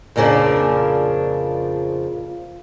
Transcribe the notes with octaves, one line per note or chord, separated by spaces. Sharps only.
F2 A#2 C#3 F3 A#3 D4